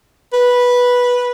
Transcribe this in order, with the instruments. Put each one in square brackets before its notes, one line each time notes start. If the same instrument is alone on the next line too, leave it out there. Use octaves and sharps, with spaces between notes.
[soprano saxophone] B4